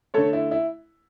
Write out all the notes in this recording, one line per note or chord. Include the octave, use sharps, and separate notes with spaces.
D3 A3 A4 C#5
E4
E4